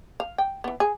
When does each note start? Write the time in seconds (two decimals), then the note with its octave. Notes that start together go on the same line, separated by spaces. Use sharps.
0.20 F5
0.38 G5
0.64 E3 B3
0.80 G#4